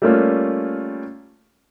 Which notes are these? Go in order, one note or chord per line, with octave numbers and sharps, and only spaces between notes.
G3 A3 A#3 C#4 F4